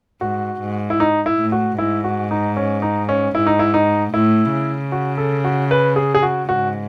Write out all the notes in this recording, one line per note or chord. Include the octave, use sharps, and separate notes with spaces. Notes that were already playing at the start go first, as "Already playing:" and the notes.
G#2 F#4
G#2
E4
D#4
E4
A2
F#4
G#2 E4
F#4
D#4
C#4
D#4
C#4
G#2 E4
D#4
E4
D#4
A2 E4
C#3
F#4
A4
F#4
B4
G#4
G#4
F#4
G#2 F#4